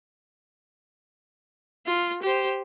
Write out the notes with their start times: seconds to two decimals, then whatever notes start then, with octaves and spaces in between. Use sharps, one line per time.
1.87 F4
2.23 G4 C5